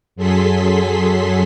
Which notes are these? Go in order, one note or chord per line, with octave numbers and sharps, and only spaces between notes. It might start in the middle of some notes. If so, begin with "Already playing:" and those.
F#2 F#3 G#4 A4 C6 B6